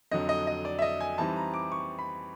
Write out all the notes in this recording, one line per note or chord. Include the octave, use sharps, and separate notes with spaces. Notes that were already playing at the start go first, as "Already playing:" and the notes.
F2 D3 F#3 D#5
D#5
D#5
D5
E5
D#5
G#5
E3 G3 C4 D#4 A5
A#5
D6
C#6
B5